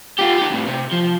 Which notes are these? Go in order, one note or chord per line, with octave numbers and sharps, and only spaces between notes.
F4 G4
D#4 G4
F2 A2
C3
F3